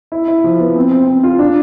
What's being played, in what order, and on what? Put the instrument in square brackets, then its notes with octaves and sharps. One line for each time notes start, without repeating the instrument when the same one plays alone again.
[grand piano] E4
E4
F3
B3
C4
C4
C4
F4
D4